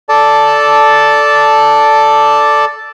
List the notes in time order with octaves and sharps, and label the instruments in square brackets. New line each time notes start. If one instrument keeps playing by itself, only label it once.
[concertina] A4 D5 A5